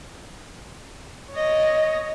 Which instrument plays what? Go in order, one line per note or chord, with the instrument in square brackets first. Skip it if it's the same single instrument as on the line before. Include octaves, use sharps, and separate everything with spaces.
[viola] C#5 D#5